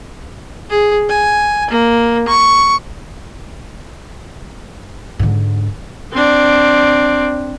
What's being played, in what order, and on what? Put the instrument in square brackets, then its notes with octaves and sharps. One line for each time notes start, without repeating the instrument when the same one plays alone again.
[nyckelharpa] G#4
G#5
A#3
C#6
[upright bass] G#2 D3
[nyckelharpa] C4 D4